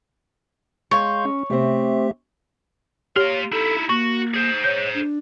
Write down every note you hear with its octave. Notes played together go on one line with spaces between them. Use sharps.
G#3 C#5 F5 C6 G6
C#4
C3 A3 C4 G4 E5
A#3 G4 C#5 C6
D#4 E4 A4
A#3 F#4 C#6
G#4 C5
C#5 G6
D4